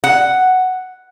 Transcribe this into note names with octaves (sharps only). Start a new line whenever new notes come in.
F#5